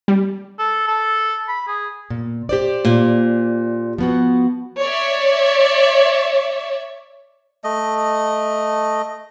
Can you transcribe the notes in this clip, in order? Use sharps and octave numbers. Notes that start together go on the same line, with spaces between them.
G3
A4
A4
B5
G#4
A#2
G4 C5 D5
A#2
F3 B3 F#4
C#5 D5 E5
A3 D#5